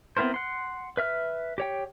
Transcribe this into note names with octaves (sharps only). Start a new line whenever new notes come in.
B3 C4 E4 A#4 C5
F#5 C6
B4 E5 F6
G4 C#5 G5